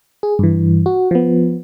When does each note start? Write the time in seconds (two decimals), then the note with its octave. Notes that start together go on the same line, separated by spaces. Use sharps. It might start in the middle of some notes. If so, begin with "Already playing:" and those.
0.23 G#4
0.39 G2 E3
0.86 F#4
1.11 F3 B3